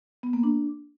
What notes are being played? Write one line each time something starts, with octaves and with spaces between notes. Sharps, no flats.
B3
A#3
D4